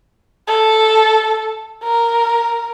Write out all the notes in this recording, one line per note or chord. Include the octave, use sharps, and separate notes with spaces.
A4
A#4